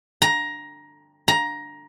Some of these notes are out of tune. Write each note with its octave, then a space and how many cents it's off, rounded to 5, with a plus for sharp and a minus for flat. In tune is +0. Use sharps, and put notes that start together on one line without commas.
A#5 +15
A#5 +15